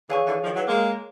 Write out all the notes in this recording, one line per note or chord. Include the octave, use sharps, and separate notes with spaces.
D3 E3 G#4 C#5 F5 G#5 C#6
D3 E3
D#3 F3
E3 F#3
G#3 A#3